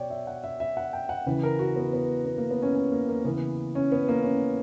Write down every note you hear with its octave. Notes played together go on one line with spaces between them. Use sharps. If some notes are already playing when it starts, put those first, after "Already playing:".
Already playing: B2 C#5 D5 G5
E5
F#5
E5
E5
F#5
G5
F#5
C#3 E3 B4
A#4
F#4
B3
B3
B3
A#3
B3
C#4
C#4
A#3
A#3
C#3 E3 B3
C#4
B3
A#3
C#4